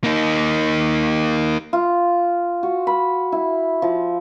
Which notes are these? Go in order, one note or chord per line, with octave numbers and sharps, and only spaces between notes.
A#3 D#4
F4
F#4
B5
E4
F3